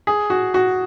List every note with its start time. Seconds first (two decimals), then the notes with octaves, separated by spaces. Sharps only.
0.07 G#4
0.30 F#4
0.54 F#4